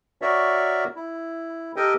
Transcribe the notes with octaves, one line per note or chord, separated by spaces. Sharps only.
F#4 A#4 C#5 D5 E5
E4
G4 A4 A#4 D#5 G5